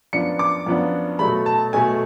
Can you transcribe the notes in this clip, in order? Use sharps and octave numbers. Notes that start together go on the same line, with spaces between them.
F#2 F3 B3 D4 C#7
D6
F#2 F3 B3 D4
B2 F#3 A3 B5
A5
B2 F#3 A3 G#5